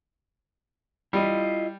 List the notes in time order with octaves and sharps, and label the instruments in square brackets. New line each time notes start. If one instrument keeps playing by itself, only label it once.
[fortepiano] G3 [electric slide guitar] E4 F4 D#5